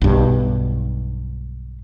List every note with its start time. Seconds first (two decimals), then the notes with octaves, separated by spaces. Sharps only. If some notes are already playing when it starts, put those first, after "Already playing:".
0.02 B1 G2